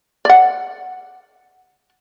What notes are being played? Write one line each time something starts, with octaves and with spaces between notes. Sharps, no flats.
D5 F#5